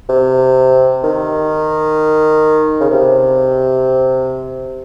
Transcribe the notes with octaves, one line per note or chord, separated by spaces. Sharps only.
C3
D#3
C#3
C3